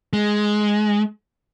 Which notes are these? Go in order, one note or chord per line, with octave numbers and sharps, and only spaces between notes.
G#3